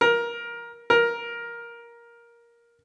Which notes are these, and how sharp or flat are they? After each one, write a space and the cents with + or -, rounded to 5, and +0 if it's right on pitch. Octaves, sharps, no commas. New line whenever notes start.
A#4 +15
A#4 +10